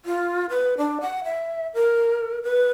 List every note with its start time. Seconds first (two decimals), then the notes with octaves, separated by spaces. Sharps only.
0.05 F4
0.50 B4
0.78 D4
1.01 F#5
1.24 E5
1.74 A#4
2.43 B4